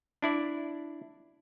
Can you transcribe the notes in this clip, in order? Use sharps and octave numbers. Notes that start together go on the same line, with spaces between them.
D4 E4 D5